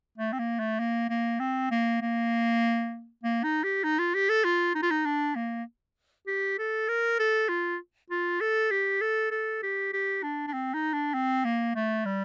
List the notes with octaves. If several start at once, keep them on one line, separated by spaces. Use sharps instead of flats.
A3
C4
A#3
A3
A#3
A#3
C4
A#3
A#3
A#3
D#4
G4
D#4
F4
G4
A4
F4
D#4
F4
D#4
D4
A#3
G4
A4
A#4
A4
F4
F4
A4
G4
A4
A4
G4
G4
D4
D4
C4
D#4
D4
C4
A#3
A3
G3